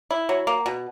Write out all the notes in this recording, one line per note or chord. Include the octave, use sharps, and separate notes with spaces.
E4
F#3
A#3
B2